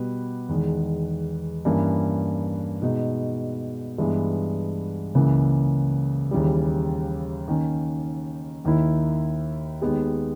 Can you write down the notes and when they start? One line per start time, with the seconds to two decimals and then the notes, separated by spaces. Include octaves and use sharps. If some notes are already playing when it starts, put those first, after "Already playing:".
Already playing: B2 G3 B3 G4 B4
0.49 E2 D#3 G#3
1.65 G2 E3 A#3 C#4
2.82 B2 G#3 D#4
3.98 G2 E3 G#3 B3
5.15 C#2 C#3 E3 A#3 C#4
6.31 D#2 C#3 E3 G3
7.48 D#3 A#3 C#4
8.65 D#2 D#3 A#3 E4
9.82 D#2 D#3 G#3 B3 G4